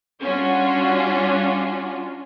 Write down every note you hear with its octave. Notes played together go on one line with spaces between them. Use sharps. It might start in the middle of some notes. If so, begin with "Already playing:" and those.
G3 C#4 D4 F4 F#4